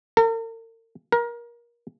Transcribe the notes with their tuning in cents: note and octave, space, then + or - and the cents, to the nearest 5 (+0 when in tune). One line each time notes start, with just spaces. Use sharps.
A#4 -45
A#4 +25